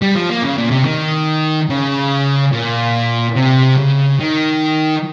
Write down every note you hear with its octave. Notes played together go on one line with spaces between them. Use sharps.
G3
F3
A#3
C#3
A#2
C3
D#3
C#3
A#2
C3
C#3
D#3